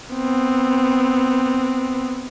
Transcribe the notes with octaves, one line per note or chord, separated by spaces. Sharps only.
B3 C4